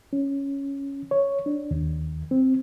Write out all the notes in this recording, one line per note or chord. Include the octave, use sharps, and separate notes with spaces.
C#4
C#5
D4
D#2
C4